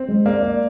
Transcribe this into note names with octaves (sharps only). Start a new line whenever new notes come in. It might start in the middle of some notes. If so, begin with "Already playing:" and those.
Already playing: C4
G#3
A#3 D5
D5